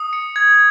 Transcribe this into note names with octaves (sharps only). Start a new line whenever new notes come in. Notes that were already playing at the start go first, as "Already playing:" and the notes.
Already playing: D#6
C#7
G#6